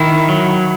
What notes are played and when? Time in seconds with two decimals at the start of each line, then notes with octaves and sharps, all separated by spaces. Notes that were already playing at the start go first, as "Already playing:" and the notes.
Already playing: D#3 E4
0.29 F#3